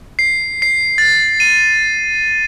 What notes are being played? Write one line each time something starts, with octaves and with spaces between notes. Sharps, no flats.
C7
C7
A6
D#7